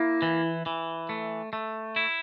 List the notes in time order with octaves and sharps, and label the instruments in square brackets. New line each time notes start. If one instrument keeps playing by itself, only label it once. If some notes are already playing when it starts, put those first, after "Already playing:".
Already playing: [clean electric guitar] A#3 [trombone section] E4
[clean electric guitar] E3
E3
A3
A3
E4